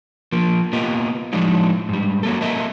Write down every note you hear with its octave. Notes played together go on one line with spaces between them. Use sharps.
F3 A#3
A#3 B3 F4 G4 D#5
A2 F3 F#3 G#3 D4 D#4
G#2 G3
F#3 A#3 A4
A3 A#3 A#4 D#5 E5